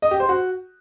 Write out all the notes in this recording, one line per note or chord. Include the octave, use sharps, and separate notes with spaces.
D#5
G4
C5
F#4